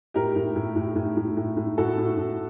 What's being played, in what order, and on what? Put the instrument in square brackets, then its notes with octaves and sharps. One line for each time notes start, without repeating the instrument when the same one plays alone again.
[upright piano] A2 G4 A#4
A2
A2
A2
A2
A2
A2
A2
A2 F#4 A4
A2
A2